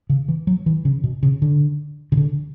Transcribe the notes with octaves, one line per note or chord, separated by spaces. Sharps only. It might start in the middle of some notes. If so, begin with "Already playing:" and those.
C#3
E3
F#3
E3
C#3
B2
C#3
D3
C#3
D3